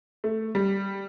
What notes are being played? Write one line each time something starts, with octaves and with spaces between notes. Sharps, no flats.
A3
G3